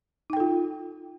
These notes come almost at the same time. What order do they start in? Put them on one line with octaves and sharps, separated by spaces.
D#4 G5 A4 F4